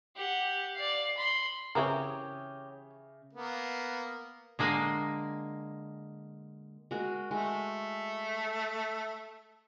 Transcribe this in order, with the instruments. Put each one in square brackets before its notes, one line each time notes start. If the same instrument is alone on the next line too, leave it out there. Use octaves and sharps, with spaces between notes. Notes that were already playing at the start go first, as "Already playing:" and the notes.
[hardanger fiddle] G4 F#5
D5 F5
B5 C6
[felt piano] C#3 E5 D#6 [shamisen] E3 C4 A#4 [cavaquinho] G4 C#5
[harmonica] A#3 B3
[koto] D3 G#3 A#3 G#5
[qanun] G#3 F#4 A#4
[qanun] G#3 [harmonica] A3